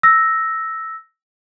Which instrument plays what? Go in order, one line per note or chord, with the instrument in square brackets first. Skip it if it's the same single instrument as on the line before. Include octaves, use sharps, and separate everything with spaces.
[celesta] E6 A#6